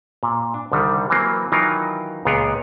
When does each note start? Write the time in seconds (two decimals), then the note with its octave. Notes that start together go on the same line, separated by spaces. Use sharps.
0.23 A#2
0.54 D4
0.72 C2 D3 D#3 G3
1.10 E3 F#3 A#3 C4
1.52 D#3 E3 F#3 D#4 F4 A#4
2.25 C#2 A#2 B3 G#4 C#5 G5